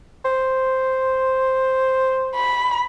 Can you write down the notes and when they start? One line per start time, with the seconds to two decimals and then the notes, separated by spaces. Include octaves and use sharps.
0.25 C5
2.36 B5